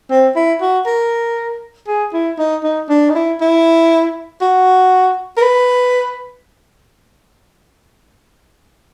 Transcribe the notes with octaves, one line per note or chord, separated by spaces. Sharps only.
C4
E4
F#4
A#4
G#4
E4
D#4
D#4
D4
D#4
E4
E4
F#4
A#4
B4